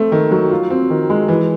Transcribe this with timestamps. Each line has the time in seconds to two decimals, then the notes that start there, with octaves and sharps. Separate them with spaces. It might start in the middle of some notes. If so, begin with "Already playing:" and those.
Already playing: A3 C4
0.12 D#3
0.31 F#3
0.51 F4
0.70 C4
0.90 D#3
1.10 G#3
1.28 E3